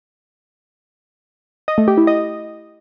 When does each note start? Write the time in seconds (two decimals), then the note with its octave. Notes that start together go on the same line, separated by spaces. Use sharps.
1.68 D#5
1.78 A3
1.88 G4
1.98 E4
2.07 D#5